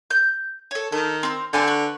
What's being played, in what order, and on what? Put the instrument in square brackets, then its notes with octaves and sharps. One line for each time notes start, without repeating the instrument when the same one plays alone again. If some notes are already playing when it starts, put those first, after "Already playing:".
[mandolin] G6
A4 C#5
[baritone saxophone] D#3 [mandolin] A4
[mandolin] C4 A#4
[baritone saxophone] D3 [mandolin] C4 G#5 G6
[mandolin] B4 C#6